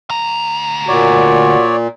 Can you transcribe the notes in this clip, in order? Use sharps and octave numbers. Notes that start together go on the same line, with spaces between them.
D2 A#5
A#2 F#4 C#5 D5